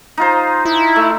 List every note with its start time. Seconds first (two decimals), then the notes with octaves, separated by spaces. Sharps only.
0.18 D#4 F4 C5
0.65 E4
0.96 A3